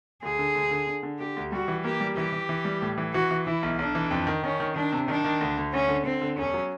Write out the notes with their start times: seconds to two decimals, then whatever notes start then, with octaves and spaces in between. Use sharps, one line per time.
0.22 D2 G#4
0.39 D3
0.55 D2
0.71 D3
0.87 D3
1.03 D3
1.19 D3 G4
1.36 D2
1.52 G3 F#4
1.68 E3
1.84 A#3 G4
2.00 G3
2.16 E3 G4
2.32 E3
2.49 E3
2.65 G3
2.82 A2
2.98 E3
3.14 E3 F#4
3.31 E3
3.46 E3 E4
3.63 B1
3.79 B1 D4
3.95 E3
4.11 F2
4.27 D#3
4.44 D#3 C#4
4.60 D#3
4.76 D#3 D4
4.92 C3
5.08 D#3 D4
5.24 D#3
5.41 D2
5.57 D2
5.73 D2 C#4
5.89 D3
6.05 D3 C4
6.22 D3
6.38 E1 C#4
6.54 F#3